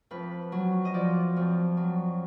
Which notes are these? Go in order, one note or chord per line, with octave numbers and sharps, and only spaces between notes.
F2 B4
F#3
D#5
F3 D5
F2
F#3